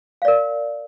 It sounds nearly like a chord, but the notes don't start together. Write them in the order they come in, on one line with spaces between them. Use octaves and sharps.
F5 D5 A#4